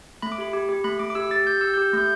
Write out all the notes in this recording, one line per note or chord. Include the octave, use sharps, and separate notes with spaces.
A3 B5
D6
G4 B5
G4
G4
A3 B5
A3 D6
D6
G4 E6
G4 A6
G4 G6
G4 E6
G4 G6
A3 G6